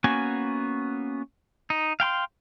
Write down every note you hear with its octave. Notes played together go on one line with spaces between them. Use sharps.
A#3 B3 C#4 F#4 G#5
D#4
F5 G5 B5 C6